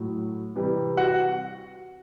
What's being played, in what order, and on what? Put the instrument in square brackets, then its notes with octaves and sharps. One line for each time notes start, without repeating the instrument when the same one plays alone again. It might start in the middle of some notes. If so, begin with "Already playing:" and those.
Already playing: [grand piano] A2 F#3
C3 E3 G3
F#4 F#5